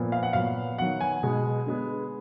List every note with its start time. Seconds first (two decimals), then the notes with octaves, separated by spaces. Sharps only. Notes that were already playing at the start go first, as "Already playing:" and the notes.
Already playing: A#2 F3 B3
0.12 F5
0.23 F#5
0.33 A#2 F#3 B3 F5
0.78 D#3 F#3 B3 F#5
1.01 G#5
1.23 B2 G#3 B3
1.67 D3 G#3 B3